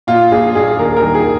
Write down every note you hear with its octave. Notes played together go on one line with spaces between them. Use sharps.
A#2 F4
A#1 G#4
A#1 G#4
D#2 A#4
A#4
D#3
G#4